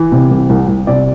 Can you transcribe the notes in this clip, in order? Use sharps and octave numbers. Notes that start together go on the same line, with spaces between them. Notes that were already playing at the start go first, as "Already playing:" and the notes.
Already playing: E3
C3
C2
C2
C2
C3 D5